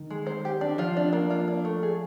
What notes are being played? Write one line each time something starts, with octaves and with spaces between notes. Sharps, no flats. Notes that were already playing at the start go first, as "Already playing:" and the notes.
Already playing: D#3
G#3
C5
G4
D4
F3 F4
D4
A#3
F4
D4
A3
G#4